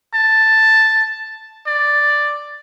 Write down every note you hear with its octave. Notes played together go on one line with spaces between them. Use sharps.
A5
D5